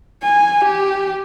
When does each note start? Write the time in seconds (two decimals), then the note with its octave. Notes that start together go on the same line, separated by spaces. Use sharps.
0.23 G#5
0.64 G4